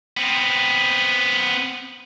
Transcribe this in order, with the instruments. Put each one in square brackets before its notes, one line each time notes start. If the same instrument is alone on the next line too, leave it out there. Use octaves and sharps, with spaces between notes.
[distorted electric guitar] B3 C4